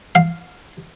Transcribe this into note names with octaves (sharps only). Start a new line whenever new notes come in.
F5